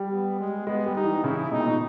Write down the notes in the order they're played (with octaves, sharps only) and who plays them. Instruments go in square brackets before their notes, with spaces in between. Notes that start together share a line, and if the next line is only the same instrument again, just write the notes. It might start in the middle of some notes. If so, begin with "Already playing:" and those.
Already playing: [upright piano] G3
[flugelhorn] B3
G#3
[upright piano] G#3 [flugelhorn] B3
[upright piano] G3
[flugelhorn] D#4
[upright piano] E3
[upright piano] C#3 [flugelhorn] E4
[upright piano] B2 [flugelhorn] D#4
[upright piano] A#2
B2